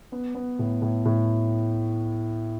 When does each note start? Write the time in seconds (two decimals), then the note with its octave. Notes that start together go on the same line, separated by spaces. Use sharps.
0.12 B3
0.35 B3
0.59 A2
0.82 A2
1.05 A2